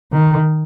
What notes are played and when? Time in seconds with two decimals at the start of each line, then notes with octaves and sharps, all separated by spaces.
0.13 D#3